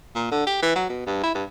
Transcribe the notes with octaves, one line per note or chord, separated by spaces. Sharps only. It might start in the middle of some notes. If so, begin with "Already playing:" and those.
A#2
D3
G4
E3
F#3
B2
G2
E4
G2